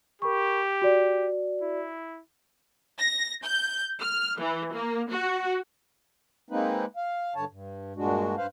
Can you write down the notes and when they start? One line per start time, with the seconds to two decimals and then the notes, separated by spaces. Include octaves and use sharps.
0.22 G4 A#4 B5 C#6
0.82 F#4 D5
1.62 E4
2.98 A#6
3.44 G6
3.99 F6
4.39 E3
4.73 A#3
5.10 F#4
6.50 G#3 A#3 C4 D#4 B4
6.97 F5
7.36 G2 D3 C#5 A5
7.51 G2
7.96 G2 A#2 G#3 D4 F#4
8.37 G2 B4 C5 F5